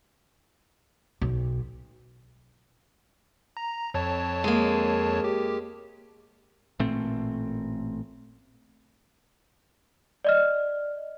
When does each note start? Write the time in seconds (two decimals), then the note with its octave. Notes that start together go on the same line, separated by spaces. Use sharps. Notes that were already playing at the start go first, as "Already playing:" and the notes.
1.22 B1
3.57 A#5
3.94 F2 C#5 A5
4.44 G#3 A#3
5.24 G4
6.79 A1 A#2 A3 C4
10.25 D5 D#5 F6